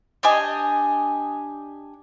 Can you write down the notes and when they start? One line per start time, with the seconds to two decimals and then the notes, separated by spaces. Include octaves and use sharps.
0.23 D4 G4 D#5 G#5